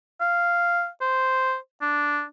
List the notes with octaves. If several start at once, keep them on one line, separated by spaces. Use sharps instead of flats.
F5
C5
D4